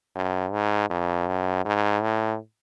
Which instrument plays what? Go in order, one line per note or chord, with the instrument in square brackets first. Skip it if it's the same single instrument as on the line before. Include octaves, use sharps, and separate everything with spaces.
[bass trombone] F#2
G#2
F2
F#2
G#2
A2